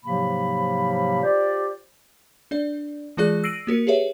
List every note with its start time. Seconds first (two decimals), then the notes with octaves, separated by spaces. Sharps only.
0.05 G#2 C3 F3 F#3 A#3 B5
1.22 F4 G4 C5 D5
2.51 D4 D5
3.17 E3 G#3 F4 G#4 D5 F#6
3.44 E6 A#6 C7 D7 D#7 F#7
3.67 A#3 F#4 A#4 C#7
3.87 G4 G#4 B4 C#5 E5